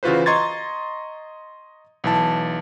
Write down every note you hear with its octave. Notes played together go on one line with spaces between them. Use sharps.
C#3 E3 F4 F#4 B4 C5
D#5 A#5 C6 C#6 G#6 A6
B1 E3 A5